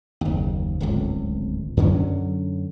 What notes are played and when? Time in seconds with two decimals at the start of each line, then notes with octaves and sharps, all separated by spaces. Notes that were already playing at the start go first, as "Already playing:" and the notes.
0.21 F#1 D#2
0.80 D1 G#1 C#2
1.77 F#2 D3 F#3 C#4